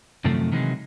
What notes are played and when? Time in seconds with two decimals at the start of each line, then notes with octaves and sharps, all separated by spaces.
0.24 F#2 C3 D#3 F3 A3
0.52 C3 D#3 E3 F#3 G#3